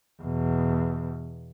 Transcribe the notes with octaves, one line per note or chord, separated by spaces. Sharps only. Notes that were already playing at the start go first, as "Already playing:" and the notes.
E2 B2